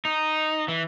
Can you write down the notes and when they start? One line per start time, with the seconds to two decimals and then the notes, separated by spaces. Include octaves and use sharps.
0.05 D#4
0.68 E3